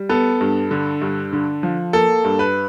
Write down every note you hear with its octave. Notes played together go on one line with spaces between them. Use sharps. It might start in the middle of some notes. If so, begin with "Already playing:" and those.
Already playing: G3
B3 A4
G2
D3
G2
D3
F3
A#3 A4
G2
B4